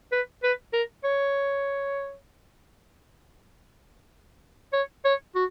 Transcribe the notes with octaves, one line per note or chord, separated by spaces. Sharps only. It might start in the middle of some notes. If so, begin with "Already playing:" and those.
B4
B4
A#4
C#5
C#5
C#5
F#4